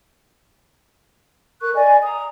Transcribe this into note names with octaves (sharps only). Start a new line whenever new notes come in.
A#4 C#6 F#6
D5 D#5 G#5
A#5 D#6